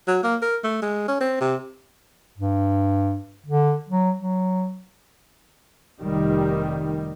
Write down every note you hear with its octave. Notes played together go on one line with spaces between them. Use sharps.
F#3
A#3
A#4
A3
G#3
C#4
C4
C3
G2
D3
F#3
F#3
F1 D#3 G3